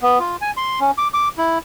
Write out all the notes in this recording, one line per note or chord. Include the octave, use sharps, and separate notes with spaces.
B3
F4
G#5
C6
C#4
D6
D6
E4